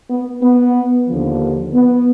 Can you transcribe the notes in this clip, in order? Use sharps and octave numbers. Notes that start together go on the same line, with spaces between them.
B3
B3
D#2 D3 F3
B3